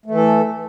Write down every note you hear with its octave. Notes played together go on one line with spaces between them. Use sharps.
E3 A3 A4